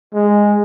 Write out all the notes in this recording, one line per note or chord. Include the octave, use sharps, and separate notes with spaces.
G#3